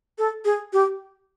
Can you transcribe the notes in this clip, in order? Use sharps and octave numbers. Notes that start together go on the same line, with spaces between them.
A4
G#4
G4